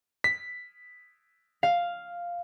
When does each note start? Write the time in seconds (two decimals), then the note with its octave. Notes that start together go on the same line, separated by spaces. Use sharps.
0.24 B6
1.63 F5